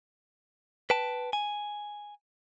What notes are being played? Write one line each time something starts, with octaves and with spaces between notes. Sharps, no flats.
B4 G5 A5
G#5